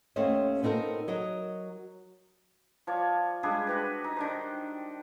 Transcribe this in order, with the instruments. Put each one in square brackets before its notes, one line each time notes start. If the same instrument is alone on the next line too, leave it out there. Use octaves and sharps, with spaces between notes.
[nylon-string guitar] D#2 A3 C#4 C5 D#5
B3 C4 D#4 A4 A#4
F#3 A#4 D#5
[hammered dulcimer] F3 C#5 D5
G3 G#3 D4 G#4
F#4 G4 B4
D#4
D#3 D4 C5